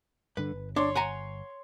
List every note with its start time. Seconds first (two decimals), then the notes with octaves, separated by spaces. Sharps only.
0.37 G2 D3 B4
0.52 G1
0.76 D4 C#5 C6
0.95 F#5 G#5 A#5